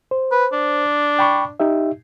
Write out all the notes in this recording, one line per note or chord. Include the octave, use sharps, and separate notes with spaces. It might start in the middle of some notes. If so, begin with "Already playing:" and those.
C5
B4
D4
G5 B5 C#6
D#4 G4 E5